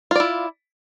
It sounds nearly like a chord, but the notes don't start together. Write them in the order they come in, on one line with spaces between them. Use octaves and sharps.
F4 D5 E4